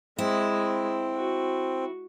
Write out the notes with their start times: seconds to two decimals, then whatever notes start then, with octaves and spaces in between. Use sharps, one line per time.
0.18 G#3 C4 E4
1.15 F#4